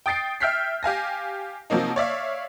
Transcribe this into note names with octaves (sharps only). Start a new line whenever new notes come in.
G5 D#6 A6 C7 D7
E5 G5 F6 G6 B6 C7
G4 F5 G#5 A#6
C3 F3 F#3 A#3 D#4
C#5 D5 E5 F5